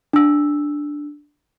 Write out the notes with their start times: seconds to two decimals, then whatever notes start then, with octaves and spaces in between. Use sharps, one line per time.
0.13 D4 E6